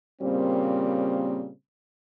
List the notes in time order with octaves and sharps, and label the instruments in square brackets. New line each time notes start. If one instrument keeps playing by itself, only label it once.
[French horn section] A#2 C#3 G3 A#3 C4